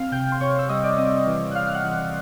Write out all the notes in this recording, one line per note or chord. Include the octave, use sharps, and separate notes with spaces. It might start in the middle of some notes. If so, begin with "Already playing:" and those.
Already playing: C4 F5 F6
C3 G5 G6
C6
C3 C#5 C#6
E6
G3 D#5 D#6
D5 D6
C4 D#5 D#6
E3
F#6
E3 F5 F6
F6
F#5 F#6
E3